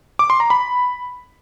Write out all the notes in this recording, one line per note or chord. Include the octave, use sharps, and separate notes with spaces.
D6
C6
A#5
B5